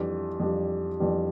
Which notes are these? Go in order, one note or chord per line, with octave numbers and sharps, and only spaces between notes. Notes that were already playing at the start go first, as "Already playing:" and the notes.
Already playing: F2 E3 G3 D4 G4
F2 E3 G3 D4 G4
F2 E3 G3 D4 G4